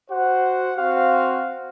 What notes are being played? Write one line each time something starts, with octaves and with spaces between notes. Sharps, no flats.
F#4 C5 F#5
C4 F#4 C5 F5